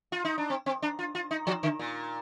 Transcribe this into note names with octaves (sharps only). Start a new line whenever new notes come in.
F4
D#4
D4
C4
C4
D4
F4
F4
D#4
F3
D3
A#2